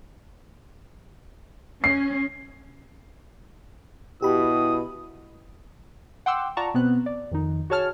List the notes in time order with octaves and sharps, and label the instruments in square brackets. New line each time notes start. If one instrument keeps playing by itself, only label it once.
[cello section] C#4 [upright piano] C7
[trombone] B2 [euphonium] E4 [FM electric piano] G4 B5 [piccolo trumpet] D#6
[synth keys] F#5 G5 C6 D6 E6
F4 D5 F#5 A5 A#5 C#6
B2 B3 C4 F#6
D5
F2 D#3 D#4
F#4 G#4 C#5 A5 F6